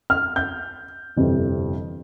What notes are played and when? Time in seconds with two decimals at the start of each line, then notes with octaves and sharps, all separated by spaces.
0.10 F6
0.36 G6
1.16 G1 F2 C3 E3